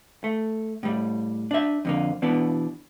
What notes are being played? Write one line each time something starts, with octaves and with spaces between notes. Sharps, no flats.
A3
A2 G3
D4 E5
F2 D3 A#3
B2 E3 B3 D4